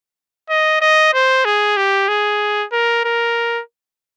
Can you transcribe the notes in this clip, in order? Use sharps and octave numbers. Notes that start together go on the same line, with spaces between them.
D#5
D#5
C5
G#4
G4
G#4
A#4
A#4